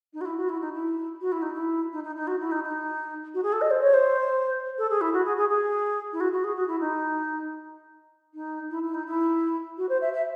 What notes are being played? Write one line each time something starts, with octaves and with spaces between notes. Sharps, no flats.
D#4
F#4
E4
F#4
E4
D#4
E4
F#4
E4
D#4
E4
D#4
D#4
D#4
F#4
E4
D#4
D#4
F#4
G#4
A4
D#5
C5
C#5
C5
A4
G#4
E4
F#4
G#4
G#4
G#4
E4
F#4
F#4
G#4
F#4
E4
D#4
D#4
E4
E4
D#4
E4
F#4
C5
E5
E5